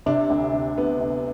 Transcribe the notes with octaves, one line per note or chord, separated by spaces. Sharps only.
C3 D4
D2
D2
D2 B3
D2